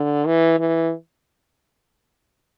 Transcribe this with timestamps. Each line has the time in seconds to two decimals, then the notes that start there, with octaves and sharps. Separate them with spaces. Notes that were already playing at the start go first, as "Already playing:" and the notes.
Already playing: D3
0.27 E3
0.59 E3